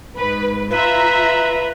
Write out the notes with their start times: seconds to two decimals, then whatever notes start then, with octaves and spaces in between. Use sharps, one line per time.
0.16 G#2 B4
0.71 F4 B4 E5 A#5